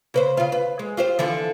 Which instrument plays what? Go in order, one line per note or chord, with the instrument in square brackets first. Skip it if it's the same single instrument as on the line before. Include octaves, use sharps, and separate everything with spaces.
[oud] C#3 B4 C5
C#3 F4
B4
G#3
F4 G4 C5
D3 E3 F3